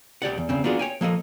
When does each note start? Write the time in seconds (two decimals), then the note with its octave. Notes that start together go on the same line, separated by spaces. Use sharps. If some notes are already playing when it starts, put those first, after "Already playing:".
0.22 C2 G4 D5 F#5
0.38 E2
0.49 E2 C#3 C4
0.64 A#3 B3 D4 F4 F#4 G#4
0.79 C#5 G5 G#5
1.01 F3 A#3 A4 D#5